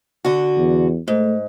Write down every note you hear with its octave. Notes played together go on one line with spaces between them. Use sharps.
D3 F#4
E2
G#2 A3